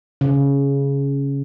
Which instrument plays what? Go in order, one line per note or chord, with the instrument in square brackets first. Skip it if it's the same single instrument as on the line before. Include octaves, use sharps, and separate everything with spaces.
[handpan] C#3